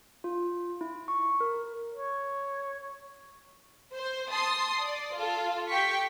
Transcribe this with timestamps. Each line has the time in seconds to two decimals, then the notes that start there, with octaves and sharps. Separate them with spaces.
0.24 F4
0.81 E4
1.08 C#6
1.41 A#4
1.94 C#5
3.95 C5
4.31 A5 C6 D#6
4.83 D5
5.15 F4 A4
5.69 G4 G5 C#6 B6